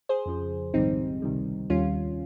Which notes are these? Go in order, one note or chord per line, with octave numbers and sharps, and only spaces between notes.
G#4 C5
F2 C#3 F3
A#1 G#2 D#3 G3 C4 D#4
C#2 C3 D#3 G3
D#2 D#3 G3 C#4 F4